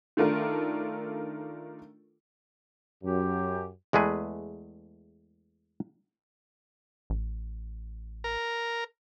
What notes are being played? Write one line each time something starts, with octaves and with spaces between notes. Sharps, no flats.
D#3 A3 D4 F4 A4 A#4
F#2 G4
E2 G#3 A3 G#4 B4
A1
A#4